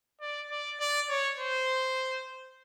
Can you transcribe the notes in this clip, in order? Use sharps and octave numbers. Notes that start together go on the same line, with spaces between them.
D5
D5
D5
C#5
C5